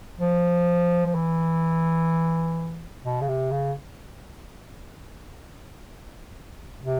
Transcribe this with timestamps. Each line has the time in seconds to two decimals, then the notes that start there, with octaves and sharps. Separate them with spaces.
0.20 F3
1.06 F3
1.15 E3
3.04 B2
3.21 C#3
3.28 C3
3.51 C#3
6.83 C3